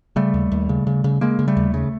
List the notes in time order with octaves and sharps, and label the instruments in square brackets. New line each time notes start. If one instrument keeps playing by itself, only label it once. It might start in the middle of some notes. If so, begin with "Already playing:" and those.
[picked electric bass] C#3 G3 A3
D#2
D#2
C#3
C#3
C#3
C#3 G#3 A#3
C#3
G3 A3
D#2
C#3